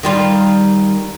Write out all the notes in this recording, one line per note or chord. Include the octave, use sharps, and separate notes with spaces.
D#3 G3 F4